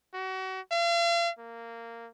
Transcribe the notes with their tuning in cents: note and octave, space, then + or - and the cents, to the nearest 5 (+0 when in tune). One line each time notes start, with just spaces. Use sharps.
F#4 +35
F5 -40
A#3 -10